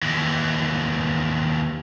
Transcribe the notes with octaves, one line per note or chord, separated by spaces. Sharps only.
D#2 E3